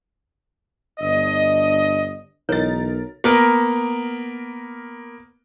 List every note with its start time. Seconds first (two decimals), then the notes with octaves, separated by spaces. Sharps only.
1.00 G1 D4 D#5
2.49 B1 E3 D#4 A#4 C#5 A6
3.24 A#3 B3 A#4